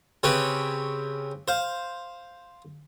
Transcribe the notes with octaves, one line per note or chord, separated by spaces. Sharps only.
C#3 C4 G4 B4 C#5
C5 F5